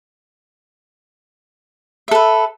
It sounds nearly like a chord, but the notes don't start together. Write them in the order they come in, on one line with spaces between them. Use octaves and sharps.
E5 A4 B4